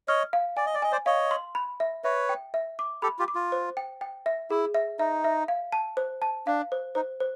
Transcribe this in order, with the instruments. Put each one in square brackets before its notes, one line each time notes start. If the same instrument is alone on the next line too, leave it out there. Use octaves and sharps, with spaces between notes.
[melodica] C#5 D#5 [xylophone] F6
[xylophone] F5
[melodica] D5 [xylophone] G#5
[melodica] D#5
D5
[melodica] D#5 [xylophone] G#5
[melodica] C5 D5
[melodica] C#5 D#5 [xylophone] F5
[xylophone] C6
B5
E5
[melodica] B4 C#5 [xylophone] E5
[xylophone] G5
E5
D6
[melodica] G4 A4 [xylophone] B5
[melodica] F4 G4
[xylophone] D6
[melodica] F4
[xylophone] C5
G5
G5
E5
[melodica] E4 [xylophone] G#4
[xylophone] E5
[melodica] D#4 [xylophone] E5
[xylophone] E5
F5
A5
C5
A5
[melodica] D4 [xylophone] F5
[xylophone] C5
[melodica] D#4 [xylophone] C5
[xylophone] C5